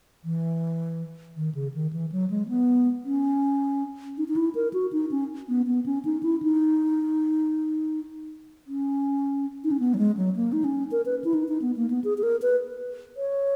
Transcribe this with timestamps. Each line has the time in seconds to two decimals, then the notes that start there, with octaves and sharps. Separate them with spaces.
0.24 E3
1.37 D#3
1.55 C#3
1.74 D#3
1.93 E3
2.12 F#3
2.30 G#3
2.49 B3
3.05 C#4
4.18 D#4
4.28 D#4
4.36 E4
4.55 A#4
4.73 F#4
4.93 D#4
5.11 C#4
5.49 B3
5.67 B3
5.86 C#4
6.05 D#4
6.23 E4
6.42 D#4
8.67 C#4
9.64 D#4
9.71 C#4
9.80 B3
9.94 F#3
9.99 G#3
10.17 F#3
10.36 A#3
10.53 D#4
10.64 C#4
10.92 A#4
11.06 B4
11.24 E4
11.34 D#4
11.48 D#4
11.62 B3
11.76 A#3
11.90 B3
12.04 G#4
12.18 G#4
12.23 A#4
12.42 B4
13.17 C#5